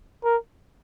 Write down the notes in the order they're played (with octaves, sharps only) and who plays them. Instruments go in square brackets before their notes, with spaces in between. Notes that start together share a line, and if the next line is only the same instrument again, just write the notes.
[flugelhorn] A#4